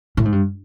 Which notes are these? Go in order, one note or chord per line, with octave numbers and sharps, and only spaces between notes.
A2
G#2
G2